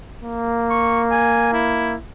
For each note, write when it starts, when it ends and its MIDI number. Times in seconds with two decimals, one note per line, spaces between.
0.23 1.96 58
0.70 1.01 85
1.11 1.48 80
1.53 1.96 64